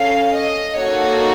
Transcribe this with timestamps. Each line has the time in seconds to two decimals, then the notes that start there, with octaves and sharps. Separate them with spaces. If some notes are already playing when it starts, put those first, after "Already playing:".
Already playing: C#4 A4 F5
0.35 D#5
0.77 A#3 D#4 F#4 A4 C#5